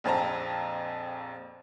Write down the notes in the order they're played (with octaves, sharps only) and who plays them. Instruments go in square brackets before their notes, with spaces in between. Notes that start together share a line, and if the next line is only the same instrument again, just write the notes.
[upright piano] A#1 F2 C4 A5 A#5